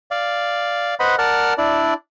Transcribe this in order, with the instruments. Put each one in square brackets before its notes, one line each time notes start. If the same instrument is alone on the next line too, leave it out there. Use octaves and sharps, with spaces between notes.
[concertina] D5 F5
B4 C5 D#5 F#5 B5
A#4 D5 F#5 A5 F6
D4 E4 D5